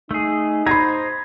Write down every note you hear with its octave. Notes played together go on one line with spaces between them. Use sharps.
A3 D#4 G#4
C5 D#5 A#5 B5 G#6